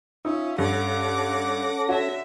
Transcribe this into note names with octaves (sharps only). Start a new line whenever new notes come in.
C#4 D#4 F4 E5
G2 C#4 A4 F#5 D6 A#6
D3 F#4 C#5 E5